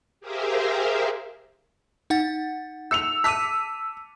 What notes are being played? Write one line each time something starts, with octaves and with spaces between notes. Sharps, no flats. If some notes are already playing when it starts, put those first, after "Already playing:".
G4 G#4 A#4 C5 E5 F5
D#4 F#5 A6
E6 C#7 F7
A5 D6 E6 B6 D#7